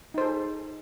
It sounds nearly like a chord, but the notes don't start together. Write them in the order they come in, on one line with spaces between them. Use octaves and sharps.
D#4 C5 A4 G#4